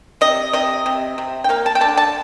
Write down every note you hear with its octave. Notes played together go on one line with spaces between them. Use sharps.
C3 D#5
C3 D#5
C3
C3
G5
A#3 F5
A5
G5
D3 A5
A5